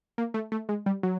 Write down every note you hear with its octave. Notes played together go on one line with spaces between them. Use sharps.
A#3
A3
A3
G#3
G3
F#3